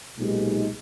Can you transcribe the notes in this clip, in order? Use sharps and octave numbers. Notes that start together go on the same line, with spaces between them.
B1 A#2 G#3 D#4 G4